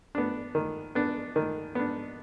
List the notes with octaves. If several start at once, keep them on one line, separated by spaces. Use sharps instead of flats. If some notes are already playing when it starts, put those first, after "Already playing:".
B3 D4
D#3
B3 D4
D#3
B3 D4